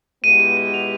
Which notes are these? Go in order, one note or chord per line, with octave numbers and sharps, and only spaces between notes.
B2 G#3 B3 E4 G4 D#7
D#7
D#7
F7